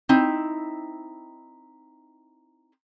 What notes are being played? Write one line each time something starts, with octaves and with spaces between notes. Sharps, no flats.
C4 D#4 E4